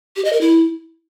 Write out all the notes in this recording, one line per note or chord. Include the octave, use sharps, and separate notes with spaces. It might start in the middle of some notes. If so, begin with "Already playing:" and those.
G4
D#5
A#4
E4